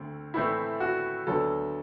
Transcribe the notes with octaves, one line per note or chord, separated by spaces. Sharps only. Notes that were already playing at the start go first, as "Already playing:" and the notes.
Already playing: D2 D3 A3 C4
A2 E3 A3 C4 E4
F#4
D2 D3 F#3 B3 A4